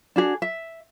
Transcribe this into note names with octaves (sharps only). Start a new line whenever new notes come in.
D4 F#4 G#4
E5